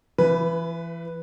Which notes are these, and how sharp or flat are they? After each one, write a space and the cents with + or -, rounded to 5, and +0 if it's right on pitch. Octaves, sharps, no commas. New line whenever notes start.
E3 +30 B4 +0